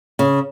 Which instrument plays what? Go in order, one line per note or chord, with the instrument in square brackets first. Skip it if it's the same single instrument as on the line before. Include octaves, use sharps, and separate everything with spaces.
[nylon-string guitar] C#3